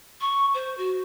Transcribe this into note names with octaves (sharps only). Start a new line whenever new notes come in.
C#6
C5
F#4